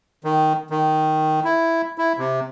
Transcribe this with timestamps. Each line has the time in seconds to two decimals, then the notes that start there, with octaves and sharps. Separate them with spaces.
0.24 D#3
0.70 D#3
1.45 E4
1.98 E4
2.18 C3